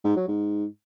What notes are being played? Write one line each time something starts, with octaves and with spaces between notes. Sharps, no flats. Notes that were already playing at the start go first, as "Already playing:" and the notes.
G#2
F#3
G#2